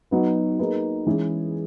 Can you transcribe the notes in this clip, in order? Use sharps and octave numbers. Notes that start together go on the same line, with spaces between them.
F#3 B3 D#4 F#4 B4
A#3 D#4 G#4 B4
E3 G#3 C#4 E4 G#4